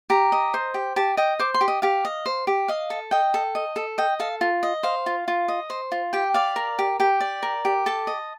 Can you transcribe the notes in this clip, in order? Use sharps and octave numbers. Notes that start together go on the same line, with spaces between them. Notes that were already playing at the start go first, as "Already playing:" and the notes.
G4 A#5
D#5
C5
G4
G4 A5
D#5 G5
C5 D6
C6
G4
D#5
G4 F5
D#5
C5
G4
D#5 F5
A4
D#5 G5
A4
D#5
A4
D#5 G5
A4 F5
F4
D#5
C5 F5
F4
F4
D#5
C5
F4
G4 G5
D5 F5
A#4
G4
G4 G5
D5
A#4
G4
A4 A5
D#5